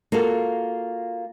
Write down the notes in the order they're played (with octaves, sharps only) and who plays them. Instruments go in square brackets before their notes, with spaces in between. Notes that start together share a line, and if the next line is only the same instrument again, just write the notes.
[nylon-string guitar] A#3 F4 F#4 A4